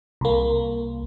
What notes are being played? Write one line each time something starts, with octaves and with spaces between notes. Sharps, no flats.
C2 A#3